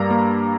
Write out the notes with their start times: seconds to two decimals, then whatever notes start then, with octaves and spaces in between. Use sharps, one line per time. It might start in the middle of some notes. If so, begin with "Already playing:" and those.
Already playing: G2 G3 A#3 A#5
0.11 A#3